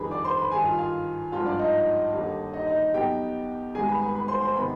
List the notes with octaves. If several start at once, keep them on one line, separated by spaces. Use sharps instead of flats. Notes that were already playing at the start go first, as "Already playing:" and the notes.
Already playing: F2 D#3 G3 D4 G#4 B4 B5
D5 D6
C5 C6
B4 B5
G2 D#3 G3 G#4 G#5
F4 F5
F4 F5
G#1 G2 F3 F4 F5
D4 D5
D#4 D#5
D#2 D3 G3 D4
D#4 D#5
D#4 D#5
B1 B2 B3 D#4 G4 G5
G#1 G#2 G3 G#4 G#5
B4 B5
B4 B5
B4 B5
C5 C6
C5 C6
C3 D#3 B3 B4 B5